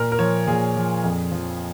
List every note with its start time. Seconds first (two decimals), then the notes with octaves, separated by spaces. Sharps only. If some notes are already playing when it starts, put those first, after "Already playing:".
Already playing: A#2 A#4
0.12 A#4
0.19 F3 C#5
0.47 A#2 G#4
0.76 F3
1.04 F2
1.32 F3